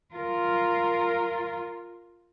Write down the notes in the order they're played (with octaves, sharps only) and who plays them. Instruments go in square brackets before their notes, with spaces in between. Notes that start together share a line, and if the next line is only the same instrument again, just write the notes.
[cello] F4 A#4